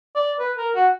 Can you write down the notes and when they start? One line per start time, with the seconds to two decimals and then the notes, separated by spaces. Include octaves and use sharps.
0.16 D5
0.40 B4
0.57 A#4
0.75 F#4